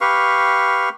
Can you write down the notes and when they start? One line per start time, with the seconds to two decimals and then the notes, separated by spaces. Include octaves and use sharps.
0.01 G4 B4 F5 C#6